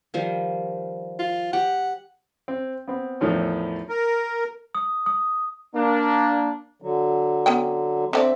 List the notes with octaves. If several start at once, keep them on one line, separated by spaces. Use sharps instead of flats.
D#3 F3 G3
F4
G4 F#5
C4
B3 C4
E2 A2 D#3 F3 C#4
A#4
D#6
D#6
A#3 D4
D3 F#3
B3 C#4 G5
D3 C4 F#4 D5 E5